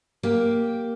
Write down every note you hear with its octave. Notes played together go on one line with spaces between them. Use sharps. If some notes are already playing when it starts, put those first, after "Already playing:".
A#3 G4